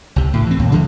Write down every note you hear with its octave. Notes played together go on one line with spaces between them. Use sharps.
C#2 C3
D2 A2
E3 C4
D#2 A#2
C#3 E3 F3 G#3